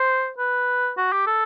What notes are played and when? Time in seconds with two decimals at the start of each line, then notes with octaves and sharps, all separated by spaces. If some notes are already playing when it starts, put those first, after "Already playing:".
Already playing: C5
0.38 B4
0.97 F#4
1.12 G4
1.27 A4